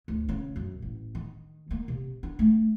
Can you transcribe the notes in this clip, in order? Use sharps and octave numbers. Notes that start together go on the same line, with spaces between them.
D2
C#3
F#2
A1
D#3
A#3
C3
D4
A3